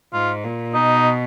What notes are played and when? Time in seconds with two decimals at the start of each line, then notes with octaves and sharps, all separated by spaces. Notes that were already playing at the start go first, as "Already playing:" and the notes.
0.13 G#2 F4
0.44 A#2
0.74 B2 D#4